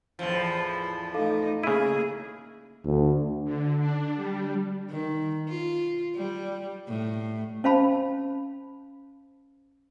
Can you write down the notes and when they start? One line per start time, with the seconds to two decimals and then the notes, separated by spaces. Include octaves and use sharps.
0.19 E2 A2 F3
1.14 A3 D#4 A4 F5
1.63 C#3 A#3 E4 G#4 D#7
2.85 D2
3.44 D3
3.79 D4
4.16 G3
4.90 D#3
5.48 F4
6.16 G3
6.88 A2
7.64 C#4 C5 F5 A5 B5